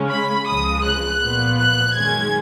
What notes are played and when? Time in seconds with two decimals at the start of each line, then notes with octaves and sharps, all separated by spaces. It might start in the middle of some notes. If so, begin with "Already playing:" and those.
Already playing: C#3 G#3 C#4
0.10 B5
0.47 C#2 C#3 F3 G#3 D#6
0.84 F#6
1.21 A#2 F3 B3
1.57 F#6
1.94 F#2 D#3 G#3 C#4 G#6